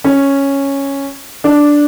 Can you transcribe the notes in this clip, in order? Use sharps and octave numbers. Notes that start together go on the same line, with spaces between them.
C#4
D4